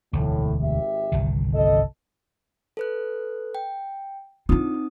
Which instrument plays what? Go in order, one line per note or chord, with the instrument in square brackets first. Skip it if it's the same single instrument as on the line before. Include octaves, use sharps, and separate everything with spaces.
[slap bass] E1 D2 [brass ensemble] A2
[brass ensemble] G#1 G4 E5
[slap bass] G1 C2 D#3
[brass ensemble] F2 A4 D#5
[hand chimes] A4 B4 F#6
G5
[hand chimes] C4 D#4 D#6 [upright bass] D4 F4